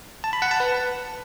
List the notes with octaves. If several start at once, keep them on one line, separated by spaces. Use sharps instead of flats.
A5
B5
F#5
A5
B4